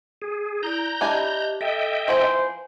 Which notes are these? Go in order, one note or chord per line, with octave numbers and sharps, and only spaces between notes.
G#4
E4 D5 A#5 G6
D4 E4 G4 D#5 G#5
A4 D#5 E5 G5
E3 F3 C4 C5 G#5